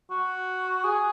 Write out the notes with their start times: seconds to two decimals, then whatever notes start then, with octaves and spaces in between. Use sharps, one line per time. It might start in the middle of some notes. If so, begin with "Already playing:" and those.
0.10 F#4
0.84 G#4